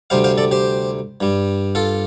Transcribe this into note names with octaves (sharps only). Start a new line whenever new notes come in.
D2 C3 G3 C5 F5
C5 F5
A4 D5
G4 C5
G2 G3
F4 A4